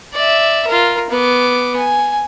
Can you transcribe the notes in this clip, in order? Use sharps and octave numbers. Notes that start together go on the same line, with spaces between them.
D5 E5
F4 A#4
B3 D6
G#5